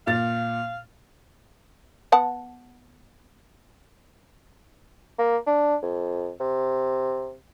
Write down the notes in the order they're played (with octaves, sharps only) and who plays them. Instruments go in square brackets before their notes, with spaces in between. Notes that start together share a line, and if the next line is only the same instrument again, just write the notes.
[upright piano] A#2 A6 [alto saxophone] F5
[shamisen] B3 F#5 A5
[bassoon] A#3
D4
F2
C3